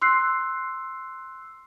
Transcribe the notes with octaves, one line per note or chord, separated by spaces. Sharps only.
C6 E6 F#6 C7